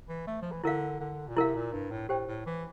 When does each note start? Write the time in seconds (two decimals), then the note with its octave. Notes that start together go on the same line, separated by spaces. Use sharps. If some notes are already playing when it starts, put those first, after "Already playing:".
0.09 E3
0.27 A3
0.42 F3
0.52 E3
0.64 D3 E4 A#4 F5
1.00 D3
1.28 A#2
1.37 C3 E4 A#4 F5
1.55 A#2
1.73 G2
1.91 A2
2.09 A2 G4 C5 G5
2.27 A2
2.46 E3